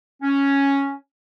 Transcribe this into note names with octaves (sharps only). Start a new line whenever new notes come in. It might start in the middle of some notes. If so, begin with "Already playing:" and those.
C#4